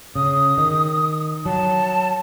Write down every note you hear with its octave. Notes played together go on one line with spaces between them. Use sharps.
C#3 D#6
D#3
F#3 A5